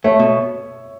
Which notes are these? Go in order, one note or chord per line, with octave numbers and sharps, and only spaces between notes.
A3 C#5 E5
B2